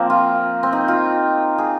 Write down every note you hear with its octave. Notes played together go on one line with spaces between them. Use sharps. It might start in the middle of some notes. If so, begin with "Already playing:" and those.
Already playing: F3 A#3 C4
F4
C4
D#4
F4
G#4